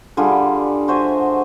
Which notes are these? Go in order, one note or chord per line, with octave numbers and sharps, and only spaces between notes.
D3 G3 F4 G#4
F#4 C5 E5 G#5